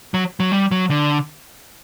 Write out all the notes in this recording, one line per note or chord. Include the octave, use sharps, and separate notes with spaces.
F#3
F#3
G3
F#3
D3